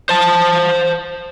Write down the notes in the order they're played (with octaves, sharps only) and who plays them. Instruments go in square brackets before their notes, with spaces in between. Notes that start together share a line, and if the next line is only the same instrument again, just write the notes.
[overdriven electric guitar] C5 A5